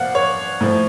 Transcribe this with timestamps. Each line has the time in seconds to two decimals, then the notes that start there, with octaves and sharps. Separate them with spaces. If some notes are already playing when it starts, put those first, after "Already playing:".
Already playing: A#2 F3 F5 F#5
0.15 C#5
0.61 A2 F3